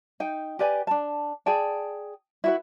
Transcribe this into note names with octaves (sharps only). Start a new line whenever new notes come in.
D#4 G5
G4 B4 D5 G#5
D4 A5
G#4 D5 G5 A5
E4 F#4 B4